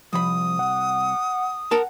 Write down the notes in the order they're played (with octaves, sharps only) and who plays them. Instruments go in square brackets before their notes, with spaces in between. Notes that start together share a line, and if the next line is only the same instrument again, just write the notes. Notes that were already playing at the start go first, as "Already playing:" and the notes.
[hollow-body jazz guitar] C2 B5 [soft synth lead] F3 [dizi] D#6
[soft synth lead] F#5
[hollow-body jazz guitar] A#4 A5 [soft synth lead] F#5